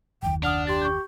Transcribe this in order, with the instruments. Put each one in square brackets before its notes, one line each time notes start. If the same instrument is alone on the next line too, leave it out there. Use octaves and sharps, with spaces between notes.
[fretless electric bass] F#1 D#2 [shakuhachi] G5
[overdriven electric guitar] D4 [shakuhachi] F#5 [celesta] D#6 F6 F7
[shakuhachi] G4 [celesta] C6 A6
[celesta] C#6 G6